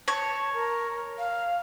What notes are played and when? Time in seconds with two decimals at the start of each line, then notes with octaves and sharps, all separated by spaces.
0.08 C#5 A5
0.53 A#4
1.18 F5